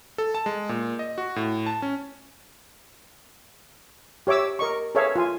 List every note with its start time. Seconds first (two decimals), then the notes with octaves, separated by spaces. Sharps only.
0.18 A4
0.35 A5
0.46 G#3
0.69 A#2
0.99 D#5
1.18 F#4
1.36 A2
1.66 A5
1.82 C#4
4.27 G4 C#5 E5 D6 E6
4.59 A#4 D#5 C#6
4.95 G#4 A4 B4 C#5 E5 F5
5.16 F4 G#5